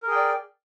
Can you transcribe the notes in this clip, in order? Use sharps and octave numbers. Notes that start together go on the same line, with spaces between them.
G#4 A#4 D5 G5